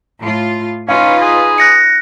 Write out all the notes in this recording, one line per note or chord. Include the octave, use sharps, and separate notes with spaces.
A2 F4
C#4 D#4 F4 B4 F5
G#4
F#6 A#6 C#7